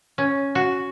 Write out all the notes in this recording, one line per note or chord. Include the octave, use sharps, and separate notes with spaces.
C#4
F#4